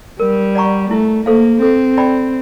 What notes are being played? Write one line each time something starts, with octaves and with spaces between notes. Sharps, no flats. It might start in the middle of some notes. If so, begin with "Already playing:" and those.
G3 A#4
D5 F#5 A#5 C#6
A3 E4
A#3 A4 C5 F5
C4 A4
D5 G5 B5